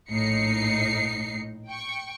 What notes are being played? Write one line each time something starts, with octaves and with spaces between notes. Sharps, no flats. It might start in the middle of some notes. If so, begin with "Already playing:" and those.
A#1 A2 D#4 C7 C#7
G5 C#6